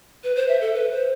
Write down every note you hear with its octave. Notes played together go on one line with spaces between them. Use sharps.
B4
C5
E5
A4
B4
C5